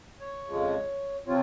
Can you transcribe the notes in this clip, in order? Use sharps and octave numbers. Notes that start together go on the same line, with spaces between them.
C#5
F2 C#3 F3 G#3
C3 F3 C4 F4 C#5